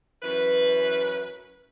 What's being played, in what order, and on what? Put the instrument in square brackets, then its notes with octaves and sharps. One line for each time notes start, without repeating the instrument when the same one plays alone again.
[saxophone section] F#2 E3 B4